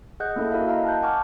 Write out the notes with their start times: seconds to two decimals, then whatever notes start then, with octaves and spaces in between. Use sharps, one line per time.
0.20 G#4 D#5 F#5 F#6 G6
0.36 A#3 C#4 E4 A4 E5
0.51 E4 F#4 A#4 E5 F5
0.67 D#5 F5 A#5
0.85 A5 F#6 G6
1.02 F#5 G#5 A5 C#6 D6 F6